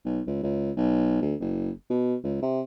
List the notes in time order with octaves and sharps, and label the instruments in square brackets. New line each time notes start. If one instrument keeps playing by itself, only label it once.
[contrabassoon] B1
C#2
C#2
B1
D2
F#1
B2
C#2
C3